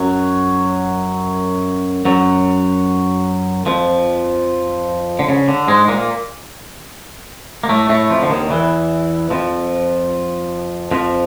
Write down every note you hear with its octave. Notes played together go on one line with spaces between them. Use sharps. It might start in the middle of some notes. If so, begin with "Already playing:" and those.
Already playing: F#2 F#3
F#2 F#3
F2 F3
D3
C#3
D3
G#2 G#3
A#2 A#3
A#3
A2 A3
A2 A3
F2 F3
D3
D#2 D#3
E2 E3
F2 F3
F2 F3